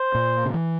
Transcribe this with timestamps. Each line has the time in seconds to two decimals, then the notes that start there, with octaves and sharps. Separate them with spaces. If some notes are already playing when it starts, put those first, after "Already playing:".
Already playing: C5
0.15 A#2
0.45 C#3
0.54 E3